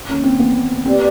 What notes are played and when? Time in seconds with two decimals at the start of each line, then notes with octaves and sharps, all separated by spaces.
0.09 C#4
0.24 C4
0.39 B3
0.86 C4 G4 B4 D5